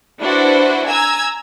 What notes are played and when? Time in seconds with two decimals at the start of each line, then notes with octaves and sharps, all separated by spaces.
0.21 D4 E4 F#4 B4 C5
0.86 G#5 A#5 E6 G#6